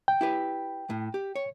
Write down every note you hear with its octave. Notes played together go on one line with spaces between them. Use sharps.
G5
E4 G4 B4
A2
G4
C#5